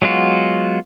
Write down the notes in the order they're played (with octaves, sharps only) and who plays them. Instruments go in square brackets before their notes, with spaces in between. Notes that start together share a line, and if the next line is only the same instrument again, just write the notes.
[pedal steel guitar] F#3 G#3 B3 F4 F#4